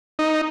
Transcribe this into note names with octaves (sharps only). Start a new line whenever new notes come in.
D#4